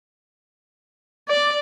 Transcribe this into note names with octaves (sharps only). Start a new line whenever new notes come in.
D5